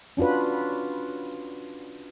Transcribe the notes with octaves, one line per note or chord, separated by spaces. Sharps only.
C#4 D4 F4 F#4 B4